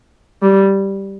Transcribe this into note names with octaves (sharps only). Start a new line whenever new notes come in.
G3